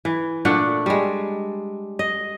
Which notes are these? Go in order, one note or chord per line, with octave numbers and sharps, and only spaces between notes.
E3
A#2 A3 D4 F#5
G3 G#3
D#5